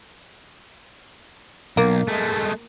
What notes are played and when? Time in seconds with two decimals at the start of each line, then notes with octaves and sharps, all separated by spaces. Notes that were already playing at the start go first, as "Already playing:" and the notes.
1.77 B1 A#3
2.08 G#3 A3